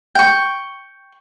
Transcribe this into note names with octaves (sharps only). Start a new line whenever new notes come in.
G5 C#6